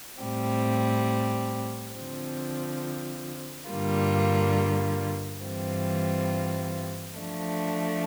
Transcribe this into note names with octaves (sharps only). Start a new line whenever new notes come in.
A2 G3 C4
D3 F3 C4
G2 D3 G3 A#3 F4
G2 E3 G3 C4 F4
F3 A3 D4